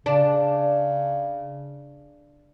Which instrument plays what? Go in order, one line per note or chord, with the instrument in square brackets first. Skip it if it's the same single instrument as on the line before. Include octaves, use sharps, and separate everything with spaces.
[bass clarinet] C#3 [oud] D4